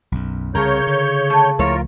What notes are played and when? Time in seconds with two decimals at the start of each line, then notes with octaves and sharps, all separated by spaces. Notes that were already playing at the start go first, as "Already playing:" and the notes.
0.12 B1 F#2
0.55 C2 C#3 A#4 C#5 G6
0.87 D3
1.30 A3
1.59 C#2 F3 A3 E4 F4 A#4 C#5